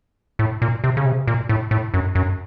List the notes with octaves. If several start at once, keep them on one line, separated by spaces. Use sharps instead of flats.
A2
A#2
C3
C#3
C3
A#2
A2
A2
F#2
F#2